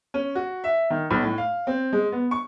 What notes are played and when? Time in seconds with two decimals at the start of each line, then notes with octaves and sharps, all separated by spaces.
0.14 C#4
0.35 F#4
0.64 E5
0.90 D#3
1.11 B1
1.22 A2
1.38 F5
1.67 C4
1.93 G#3
2.12 B3
2.31 C#6